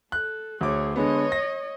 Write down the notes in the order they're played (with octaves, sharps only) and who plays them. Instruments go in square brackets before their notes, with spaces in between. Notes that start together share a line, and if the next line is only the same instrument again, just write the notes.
[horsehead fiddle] A4 [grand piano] F#6
[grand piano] D2 D6 [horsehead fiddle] G#4 C#5
[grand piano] D3 G#3 B3 [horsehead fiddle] C#5 D#5
[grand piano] A#6